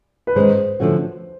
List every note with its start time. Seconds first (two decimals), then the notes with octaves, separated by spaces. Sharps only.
0.27 B4
0.36 G#2 D#3 G#3 C#4 C5
0.80 D3 F3 A3 C#4 F#4